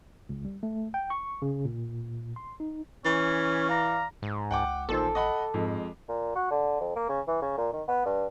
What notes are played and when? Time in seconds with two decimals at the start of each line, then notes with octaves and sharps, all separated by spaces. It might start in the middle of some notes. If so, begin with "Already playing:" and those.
0.29 C#2
0.45 G3
0.63 A3
0.94 G5
1.10 C#6
1.42 C#3
1.65 A#2
2.36 C6
2.60 D#4
3.05 E3 C#4
3.69 D5 F5 A#5
4.22 G#2
4.51 C#2 F#5 G5 D6
4.89 A1 A#2 D#3 A4 C5
5.15 D#5 F#5 B5
5.54 F2 G#2 G#3
6.09 A#2
6.36 F#4
6.51 D3
6.81 F2
6.96 A#3
7.09 C#3
7.28 E3
7.42 C#3
7.58 A#2
7.73 D#3
7.88 B3
8.05 G2